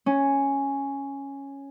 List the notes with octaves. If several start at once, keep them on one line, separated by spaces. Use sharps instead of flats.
C#4